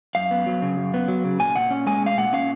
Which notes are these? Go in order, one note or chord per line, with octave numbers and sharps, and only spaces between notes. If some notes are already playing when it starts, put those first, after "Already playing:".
F#2 F5
B3
F#3
C#3
F#2
B3
F#3
C#3
A#2 G#5
A#2 F#5
C#4
G#3 G#5
A#2 F5
A#2 F#5
C#4 F5